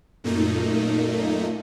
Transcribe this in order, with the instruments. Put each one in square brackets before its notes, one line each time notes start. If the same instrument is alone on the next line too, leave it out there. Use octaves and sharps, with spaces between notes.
[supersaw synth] F#2 A#2 A3 A#3 D#4